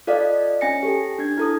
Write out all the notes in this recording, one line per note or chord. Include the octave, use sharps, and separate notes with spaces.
F4 A4 D5 D#5 F5
C#4 G#5 A#6 C#7
G4 A4
D4 G#6
E4 A4 D#6